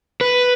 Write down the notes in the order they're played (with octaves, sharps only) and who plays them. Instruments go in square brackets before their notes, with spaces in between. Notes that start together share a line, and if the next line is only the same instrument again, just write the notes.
[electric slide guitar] B4